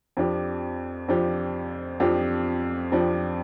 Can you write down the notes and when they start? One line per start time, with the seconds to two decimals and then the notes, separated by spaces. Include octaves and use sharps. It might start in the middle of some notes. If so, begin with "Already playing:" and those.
0.17 F2 F3 D4 G4
1.08 F2 F3 D4 G4
2.00 F2 F3 D4 G4
2.92 F2 F3 D4 G4